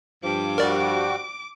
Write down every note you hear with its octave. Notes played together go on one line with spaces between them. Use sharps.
G2 F3 D6
G3 F#4 A#4 D5